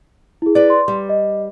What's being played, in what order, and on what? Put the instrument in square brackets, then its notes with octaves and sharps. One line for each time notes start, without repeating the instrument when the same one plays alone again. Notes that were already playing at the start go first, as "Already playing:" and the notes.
[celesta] E4 G#4
[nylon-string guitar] B4 D5
[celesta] C6
[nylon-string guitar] G3
[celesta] D#5